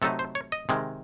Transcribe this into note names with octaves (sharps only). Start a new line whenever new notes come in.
C3 F#3 A3 D#4 A4
C5
C#5
D#5
C3 D#3 G#3